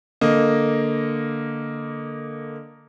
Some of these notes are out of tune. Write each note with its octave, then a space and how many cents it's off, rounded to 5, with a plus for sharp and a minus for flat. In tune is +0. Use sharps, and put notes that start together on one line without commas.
D3 +0 A#3 +0 D#5 +0